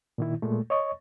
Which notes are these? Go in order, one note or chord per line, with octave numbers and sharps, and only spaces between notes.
A#2 D#3 E4
A#2 G#3 A3
C#5 D#5 C#6